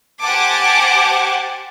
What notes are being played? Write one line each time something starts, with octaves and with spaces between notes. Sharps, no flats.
G4 C5 F#5 G#5 A5 D6